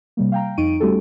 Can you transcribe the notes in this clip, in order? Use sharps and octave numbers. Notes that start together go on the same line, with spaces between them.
C3 G3 A#3
F5 G5 A#5
F2 D#4 C#6 D7 D#7
G3 A3 C#4 F#4 G4 A4